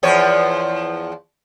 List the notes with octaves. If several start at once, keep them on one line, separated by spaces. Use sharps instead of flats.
E2 F3 C#5